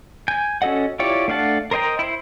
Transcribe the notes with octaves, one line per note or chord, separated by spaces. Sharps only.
G#5 G6
C#4 F#4 A4 D#5 F#5
E4 F4 G4 C#5 D5
A3 D4 F5 F#5 A5
A#4 C5 D#5 G5 A#5
E4 C5